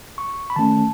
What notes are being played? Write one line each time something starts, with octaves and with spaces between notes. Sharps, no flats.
C#6
B5
D#3 A3 C#4 A5